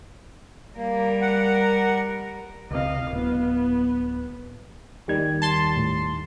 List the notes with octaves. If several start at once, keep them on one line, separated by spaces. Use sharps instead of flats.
G3 A#3 A#4
F#5
C#2 C3 D#5 F5
D1 B3
D#2 D#3 G3 G4 G#6
A5 C6
A2